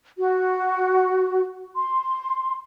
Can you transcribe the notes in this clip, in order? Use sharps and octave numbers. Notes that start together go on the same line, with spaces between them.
F#4
C6